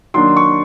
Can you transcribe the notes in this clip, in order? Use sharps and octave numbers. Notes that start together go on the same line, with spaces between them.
D#3 F#3 A#3 D4 C6
C#6